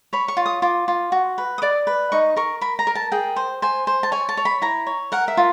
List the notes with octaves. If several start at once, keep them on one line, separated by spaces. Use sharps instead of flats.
C#5 B5
C#6
F4
D#6
F4 D6
F4
F#4
B4
D#6
D5 D6
B4
D#4 C#6
A#4 C#6
A#4 B5
A#5
A#4
A5
G#4 G5
C5
C5 G#5
C5
A5
C#5 G#5
A5
C#5
B5
E4 A#5
C#5
A#4 F#5
E5
F4